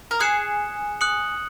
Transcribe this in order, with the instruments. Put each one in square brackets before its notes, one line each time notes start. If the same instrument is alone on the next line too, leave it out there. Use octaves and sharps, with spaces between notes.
[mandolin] A#4
[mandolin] G#4 [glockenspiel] D#6 F#6 C#7 E7
[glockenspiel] D#6 F#6 C#7 F#7